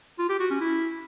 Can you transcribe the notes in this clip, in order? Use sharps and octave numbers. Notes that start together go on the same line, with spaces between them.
F4
G4
F#4
C#4
E4